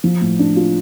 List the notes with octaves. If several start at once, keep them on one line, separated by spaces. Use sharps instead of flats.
F3
A2
D4
F4